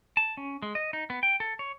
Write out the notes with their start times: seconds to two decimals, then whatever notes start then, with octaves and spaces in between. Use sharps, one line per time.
0.17 A5
0.37 C#4
0.62 G#3
0.75 D#5
0.93 D#4
1.10 B3
1.23 G5
1.40 A4
1.59 C#5